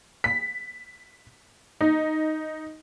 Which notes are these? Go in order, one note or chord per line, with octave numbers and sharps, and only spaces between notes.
B6
D#4